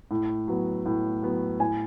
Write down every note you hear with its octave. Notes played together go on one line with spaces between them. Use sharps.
A2
F#3 B3
A2
F#3 B3
A2 G#5